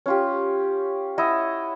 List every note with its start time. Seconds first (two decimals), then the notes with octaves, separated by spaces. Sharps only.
0.06 C#4 F4 G4
1.18 E4 D#5 F#5